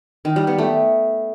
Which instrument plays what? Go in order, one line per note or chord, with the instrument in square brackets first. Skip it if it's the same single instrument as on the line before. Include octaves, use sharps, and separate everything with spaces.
[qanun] D#3
G3
B3
A3